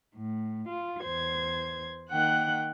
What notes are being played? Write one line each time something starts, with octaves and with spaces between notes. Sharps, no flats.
A2
F4
E2 C5 G#6
D#3 A#3 F#5 G5 F#6